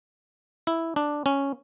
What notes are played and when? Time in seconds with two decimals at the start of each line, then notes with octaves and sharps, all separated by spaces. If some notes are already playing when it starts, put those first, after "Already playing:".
0.67 E4
0.96 D4
1.26 C#4